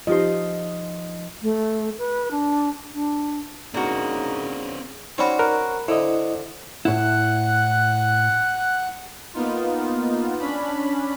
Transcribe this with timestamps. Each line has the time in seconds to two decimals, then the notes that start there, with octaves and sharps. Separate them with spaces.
0.07 F3 D#4 F4 G4 C5 D#5
1.43 A3
1.98 B4
2.31 D4
2.94 D4
3.74 C#3 A#3 C4 D4 D#4 F#4
5.18 C4 C#4 D#4 F#4 D5 B5
5.39 A#4 A#5 B5 F#6
5.88 D3 E4 C5 D#5
6.85 A2 E4 F#5 F#6
9.34 A#3 B3 D#4 F4
10.39 C#4 D4 B5